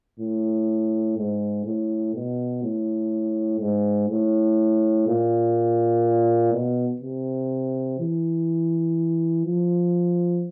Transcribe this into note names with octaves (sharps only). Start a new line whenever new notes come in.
A2
G#2
A2
B2
A2
G#2
A2
A#2
B2
C3
E3
F3